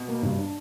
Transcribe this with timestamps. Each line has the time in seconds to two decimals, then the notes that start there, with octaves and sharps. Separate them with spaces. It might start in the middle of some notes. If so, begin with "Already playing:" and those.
Already playing: B2
0.08 A#3
0.23 G2
0.38 D4